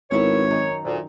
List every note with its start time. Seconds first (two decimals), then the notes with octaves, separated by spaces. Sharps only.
0.11 G#1 B3 E4 A#4 C#5
0.51 F#2 D#3 A#5
0.84 D2 A#2